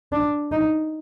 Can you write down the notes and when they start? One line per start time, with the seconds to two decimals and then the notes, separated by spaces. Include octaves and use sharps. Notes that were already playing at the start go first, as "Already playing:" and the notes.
0.12 D4
0.52 D#4